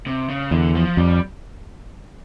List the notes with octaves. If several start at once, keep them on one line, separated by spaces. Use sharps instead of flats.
C3
C#3
E2 D3
F3
F2 G3